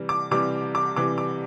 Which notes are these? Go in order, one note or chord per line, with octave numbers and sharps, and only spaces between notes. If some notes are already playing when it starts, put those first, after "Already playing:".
Already playing: C3 E3 G3
D6
C3 E3 G3 D6
D6
C3 E3 G3 D6
D6